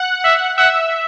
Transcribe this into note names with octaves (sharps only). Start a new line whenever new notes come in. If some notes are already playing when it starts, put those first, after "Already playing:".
Already playing: F#5
E5
E5 F#5